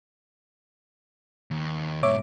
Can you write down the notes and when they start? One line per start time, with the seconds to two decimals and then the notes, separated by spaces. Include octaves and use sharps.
1.51 D#2
2.03 G#2 B2 C#5 E5 D6